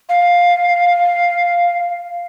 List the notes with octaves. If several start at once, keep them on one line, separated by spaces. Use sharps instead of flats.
F5